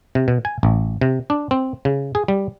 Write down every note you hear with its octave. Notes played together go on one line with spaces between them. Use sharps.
C3
B2
G#5
A1
C3
D4
C4
C#3
G#4
G3